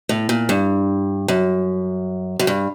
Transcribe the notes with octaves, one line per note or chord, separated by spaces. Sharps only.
A2
A#2
G2
F#2
F#2
G2